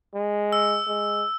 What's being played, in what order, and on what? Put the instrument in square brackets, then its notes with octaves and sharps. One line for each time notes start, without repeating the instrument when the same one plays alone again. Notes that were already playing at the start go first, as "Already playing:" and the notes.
[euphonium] G#3
[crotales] E6
[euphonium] G#3